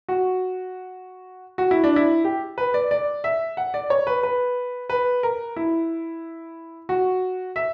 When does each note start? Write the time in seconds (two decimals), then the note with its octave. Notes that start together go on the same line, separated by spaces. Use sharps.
0.08 F#4
1.58 F#4
1.71 E4
1.84 D4
1.96 E4
2.24 G4
2.58 B4
2.74 D5
2.91 D5
3.24 E5
3.57 F#5
3.74 D5
3.90 C#5
4.07 B4
4.23 B4
4.89 B4
5.23 A#4
5.56 E4
6.89 F#4
7.56 E5